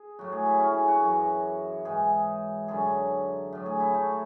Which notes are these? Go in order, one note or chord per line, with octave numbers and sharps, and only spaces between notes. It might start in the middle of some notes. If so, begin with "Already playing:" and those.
Already playing: G#4
A2 F#3 F#4
G#4
E4
C#4
G#4
F#4
F#2 E3
G#2 E3 G#4
F#2 D3 F#3 G#4
A2 F#3
G#4
E4
A3